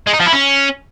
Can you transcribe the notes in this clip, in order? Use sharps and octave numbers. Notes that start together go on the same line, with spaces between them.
G#3
D#4
F3
E4
C#4